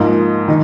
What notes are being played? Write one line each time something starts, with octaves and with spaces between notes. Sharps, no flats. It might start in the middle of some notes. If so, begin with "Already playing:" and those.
Already playing: G#2 F3 A#3 D#4
D#3 D#4